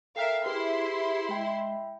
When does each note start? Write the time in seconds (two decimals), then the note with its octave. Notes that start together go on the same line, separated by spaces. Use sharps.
0.16 A4 A#4 E5 F5 G5 F6 C7
0.46 E4 G4 G#4 B4 C6
1.29 G#3 E5 G5 B5